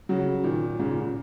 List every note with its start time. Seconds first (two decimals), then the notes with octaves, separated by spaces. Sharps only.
0.09 C#3 F#3
0.44 A#2 D#3
0.79 G#2 C#3
0.91 A#2
1.02 A#2